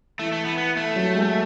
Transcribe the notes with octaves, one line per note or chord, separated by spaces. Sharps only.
E3 A3
A3
B3
B3
A3
F#3
G#3